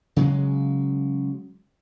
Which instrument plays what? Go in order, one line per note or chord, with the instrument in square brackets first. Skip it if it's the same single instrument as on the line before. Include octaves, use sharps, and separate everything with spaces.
[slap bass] C#3 F#3 G#3